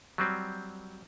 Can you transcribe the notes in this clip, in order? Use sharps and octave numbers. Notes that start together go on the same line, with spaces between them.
F#3 G3 C4